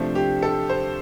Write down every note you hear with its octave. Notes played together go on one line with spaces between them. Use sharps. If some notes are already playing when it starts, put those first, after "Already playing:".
Already playing: C3 F3 A3 D4 C5
G4
A4
C5